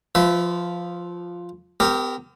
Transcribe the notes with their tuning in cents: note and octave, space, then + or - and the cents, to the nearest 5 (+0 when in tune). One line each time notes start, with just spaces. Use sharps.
F3 +0 B4 +35 E5 -10
B3 +45 G4 +0 A#4 -15